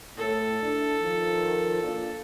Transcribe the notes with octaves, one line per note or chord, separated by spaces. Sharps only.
A2 A4
D4 E4
D#3 F3
A#2 D4 F4